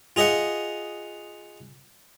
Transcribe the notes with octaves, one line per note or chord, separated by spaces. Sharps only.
F4 G#4 D#5 E5 F#5